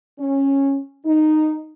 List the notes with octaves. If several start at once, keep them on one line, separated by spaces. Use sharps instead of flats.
C#4
D#4